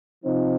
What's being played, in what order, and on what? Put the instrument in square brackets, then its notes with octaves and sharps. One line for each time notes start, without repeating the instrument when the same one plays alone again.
[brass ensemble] C3 F3 C4 D#4